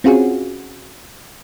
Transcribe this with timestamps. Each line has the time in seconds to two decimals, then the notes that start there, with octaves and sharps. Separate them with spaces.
0.04 C4 C#4 F4 F#4 G#4